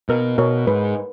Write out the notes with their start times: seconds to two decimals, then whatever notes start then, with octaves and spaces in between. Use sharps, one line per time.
0.09 B2 A#4
0.38 B2 A#4 C#5
0.67 G#2 B4